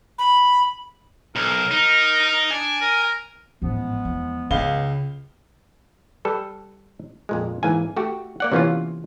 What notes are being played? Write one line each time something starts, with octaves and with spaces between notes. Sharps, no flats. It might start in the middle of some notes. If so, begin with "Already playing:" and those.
B5
B1 A#4
D#4 A#4
D4 G#5
A#4
A1 G#2 F3 G#3 B3
E2
C#2 C#3 F5 G7
G3 A4 B4
F2 A#2 G#3
G#2 E3 A#3 G#5
A3 F#4 G4
A#3 D5 F#5
C3 E3 A#3 B3 C#4 F4